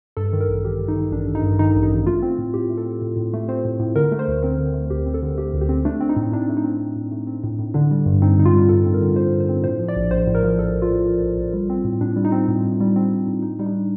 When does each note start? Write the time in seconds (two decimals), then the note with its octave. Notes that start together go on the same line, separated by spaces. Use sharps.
0.17 G2 A4
0.33 D#3
0.41 A#4
0.48 A1
0.64 A1 G4
0.81 G2
0.88 D#4
0.96 D#3
1.12 A1 D4
1.28 A1
1.35 D#4
1.43 G2
1.59 D#3 D#4
1.76 A1
1.83 D#4
1.90 A1
2.07 A3 F4
2.22 C4
2.38 A2
2.54 A2 G4
2.70 A3
2.77 A4
2.86 C4
3.02 A2
3.16 A2
3.33 A3
3.49 C4 C5
3.65 A2
3.80 A2
3.96 D3 A#4
4.12 A3
4.19 C5
4.28 D2
4.43 C4 A#4
4.59 D3
4.74 A3
4.90 D2 G4
5.06 C4
5.14 A4
5.22 D3
5.38 A3 G4
5.54 D2
5.61 G4
5.69 C4
5.85 A3 D4
6.01 C4
6.09 D#4
6.16 A2
6.32 A2 D4
6.49 A3
6.57 D#4
6.64 C4
6.80 A2
6.96 A2
7.12 A3
7.27 C4
7.44 A2
7.59 A2
7.74 D3 D4
7.91 G3
8.06 G2
8.22 C4 D#4
8.38 D3 D#4
8.45 F4
8.54 G3
8.69 G2 A4
8.86 C4
8.94 A#4
9.01 D3
9.16 G3 C5
9.33 G2
9.40 C5
9.49 C4
9.64 A2 C5
9.79 F3
9.88 D5
9.96 A#1
10.11 A#1 C5
10.27 A2
10.35 A#4
10.43 F3
10.59 A#1 A4
10.74 A#1
10.82 F4
10.90 A2
11.06 F3
11.23 A#1
11.37 A#1
11.54 G3
11.70 C4
11.85 A2
12.01 A2 D4
12.16 G3
12.24 D#4
12.32 C4
12.48 A2
12.64 A2
12.80 G3
12.96 C4
13.12 A2
13.27 A2
13.43 A2 D#4
13.59 G3 D#4
13.66 D4